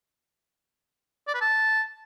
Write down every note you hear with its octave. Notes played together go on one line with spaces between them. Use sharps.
D5
B4
A5